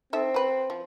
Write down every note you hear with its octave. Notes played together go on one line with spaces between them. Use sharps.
C4 D#4 A4 E5
F#4 B4
F3